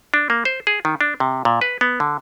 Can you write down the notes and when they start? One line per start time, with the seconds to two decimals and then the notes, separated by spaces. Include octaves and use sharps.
0.14 D4
0.30 A#3
0.45 C5
0.67 G#4
0.85 D#3
1.01 D4
1.20 C3
1.45 A#2
1.61 B4
1.81 B3
2.00 D3